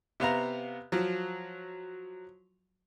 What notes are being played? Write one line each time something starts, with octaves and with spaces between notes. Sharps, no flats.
C3 B3 F5 A#5
F3 F#3